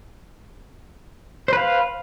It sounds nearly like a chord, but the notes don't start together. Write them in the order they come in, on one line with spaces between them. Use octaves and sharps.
C5 B4 F5